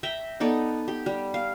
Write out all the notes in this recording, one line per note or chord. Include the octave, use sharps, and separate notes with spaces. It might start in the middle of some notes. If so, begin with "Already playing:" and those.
E5 G5 A#5
B3 D#4 A4 D5
G4
G3
F5